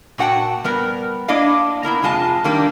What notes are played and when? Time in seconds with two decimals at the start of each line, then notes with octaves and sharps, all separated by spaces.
0.18 A#2 F#4 F#5 G5 A5
0.64 G3 B3 A#4
1.28 A#3 D4 E4 D5 D#5 F5
1.83 B3 E4 A#4 A#5
2.02 F2 C3 G#3 F4 A5
2.44 D#3 G3 A#3 D4